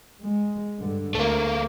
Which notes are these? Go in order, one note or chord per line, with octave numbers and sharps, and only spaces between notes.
G#3
G2 D3
D2 A3 A#3